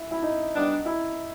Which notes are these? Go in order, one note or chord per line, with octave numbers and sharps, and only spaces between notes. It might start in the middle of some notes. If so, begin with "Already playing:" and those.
Already playing: E4
E4
D#4
G3 B3 D4
E4